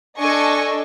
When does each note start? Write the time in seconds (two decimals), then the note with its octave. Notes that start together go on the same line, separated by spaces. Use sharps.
0.19 D4 A4 D#5 G#5 C#6